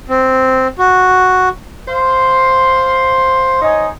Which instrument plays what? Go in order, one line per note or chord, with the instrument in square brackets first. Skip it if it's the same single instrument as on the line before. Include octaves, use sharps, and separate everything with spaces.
[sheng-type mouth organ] C4
F#4
[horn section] C5 F5 C6
D#4 C5 C#5 D#5 G#5